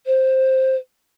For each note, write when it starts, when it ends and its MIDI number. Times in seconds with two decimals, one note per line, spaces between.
0.06 0.75 72